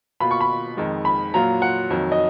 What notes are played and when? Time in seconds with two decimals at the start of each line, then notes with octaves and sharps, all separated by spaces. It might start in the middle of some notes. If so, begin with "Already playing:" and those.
0.20 B2 A#3 F4 B5
0.31 C#6
0.41 B5
0.77 F2 D#3 G#3
1.05 B5
1.34 A#2 F#3 A#3 F4 A#5
1.62 F#5
1.91 F2 D#3 F#3
2.12 D#5